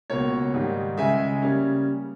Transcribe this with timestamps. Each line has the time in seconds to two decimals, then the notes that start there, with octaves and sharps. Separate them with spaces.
0.10 C#2 B2 A#3 C#5
0.54 G#2 D#3 G3
0.97 C#2 C#3 G#3 E5 G#5
1.42 C#3 G3 A#3 C#4